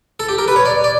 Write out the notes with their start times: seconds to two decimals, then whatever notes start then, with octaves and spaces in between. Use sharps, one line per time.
0.20 A4
0.29 G4
0.38 A#4
0.48 B4
0.56 C#5
0.65 D5
0.84 D5